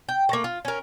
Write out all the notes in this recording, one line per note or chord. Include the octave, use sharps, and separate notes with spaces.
G5
A3 A#3
F4
C#4 A#4